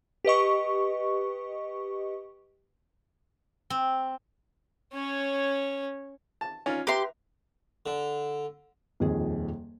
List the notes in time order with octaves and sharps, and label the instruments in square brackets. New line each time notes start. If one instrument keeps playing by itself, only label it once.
[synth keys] G4 B4 D#5 C#6
[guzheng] C4
[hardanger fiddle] C#4 C#5
[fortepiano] A5
[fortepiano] C#4 F4 [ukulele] D#4 D5
[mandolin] G4 C6 [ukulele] B4 E5 [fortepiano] A#5
[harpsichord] D3
[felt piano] D#1 F2 D#3 G#4